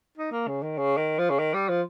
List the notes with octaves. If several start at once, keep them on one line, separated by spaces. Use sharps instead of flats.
D#4
A#3
C#3
D#3
C#3
D#3
F3
C#3
D#3
G3
F3